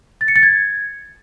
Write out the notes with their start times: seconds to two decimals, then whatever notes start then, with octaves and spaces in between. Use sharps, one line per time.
0.21 A6
0.28 C#7
0.36 A6
0.43 G#6